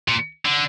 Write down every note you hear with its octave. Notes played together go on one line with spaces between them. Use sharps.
A#2
D3